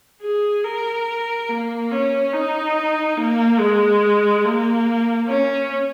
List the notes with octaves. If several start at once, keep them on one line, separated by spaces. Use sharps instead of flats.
G#4
A#4
A#3
C#4
D#4
A#3
G#3
A#3
C#4